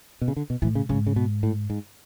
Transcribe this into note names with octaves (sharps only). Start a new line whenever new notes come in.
B2
C#3
D3
B2
A2 E3
C#3
G#2 C#3
C#3
B2
A2
G#2